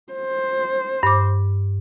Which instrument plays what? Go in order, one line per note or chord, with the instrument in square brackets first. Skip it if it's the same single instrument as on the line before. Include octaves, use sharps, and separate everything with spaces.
[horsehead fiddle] C5
[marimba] G2 D6